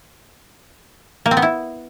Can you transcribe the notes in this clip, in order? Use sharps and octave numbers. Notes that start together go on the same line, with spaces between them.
A#3
C4
B3
E4